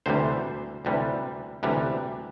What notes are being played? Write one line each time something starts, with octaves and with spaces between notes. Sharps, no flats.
D2 C3 E3 G3 C5
D2 C3 E3 G3
D2 C3 E3 G3